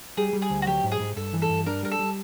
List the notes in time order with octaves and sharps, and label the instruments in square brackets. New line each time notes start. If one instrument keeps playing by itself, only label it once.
[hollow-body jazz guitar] G3 [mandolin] G#4
[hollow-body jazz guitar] G3
[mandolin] G#4
[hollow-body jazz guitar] D2
[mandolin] F#4
[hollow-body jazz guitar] F#3 [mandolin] G4
[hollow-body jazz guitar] G#2
[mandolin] G#4
[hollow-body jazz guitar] G#2
[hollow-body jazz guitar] G2 [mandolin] A4
[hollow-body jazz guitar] E3
[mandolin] A4
[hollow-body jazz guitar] G2
[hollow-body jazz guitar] D4 [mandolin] A#4
[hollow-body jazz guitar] G3 [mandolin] A#4
[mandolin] A4
[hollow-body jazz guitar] G3